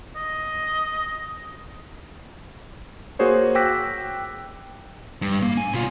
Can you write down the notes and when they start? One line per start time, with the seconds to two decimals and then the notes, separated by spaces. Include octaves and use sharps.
0.16 D#5
3.19 A#3 F#4 G#4 C5 C#5
3.55 G5 D6 E6 F#6 A#6 B6
5.22 G2
5.43 A#3
5.57 G#5
5.74 B2 F4